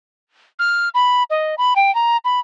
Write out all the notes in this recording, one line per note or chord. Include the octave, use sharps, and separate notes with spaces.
F6
B5
D#5
B5
G5
A#5
B5